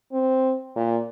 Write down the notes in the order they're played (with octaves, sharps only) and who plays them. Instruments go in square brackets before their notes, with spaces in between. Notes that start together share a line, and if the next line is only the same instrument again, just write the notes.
[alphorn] C4
A#2